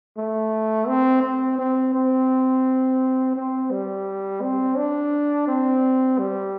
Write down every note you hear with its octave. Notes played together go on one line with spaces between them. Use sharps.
A3
C4
C4
C4
C4
C4
G3
C4
D4
C4
G3